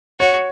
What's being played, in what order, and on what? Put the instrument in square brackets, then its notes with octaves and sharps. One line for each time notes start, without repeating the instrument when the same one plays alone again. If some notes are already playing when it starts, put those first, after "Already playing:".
[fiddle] F#4 [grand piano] C#5